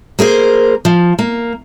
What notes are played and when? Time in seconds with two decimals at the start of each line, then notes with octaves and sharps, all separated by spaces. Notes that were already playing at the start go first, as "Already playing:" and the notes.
0.19 A#3 G#4 A#4 C5
0.85 F3
1.19 A#3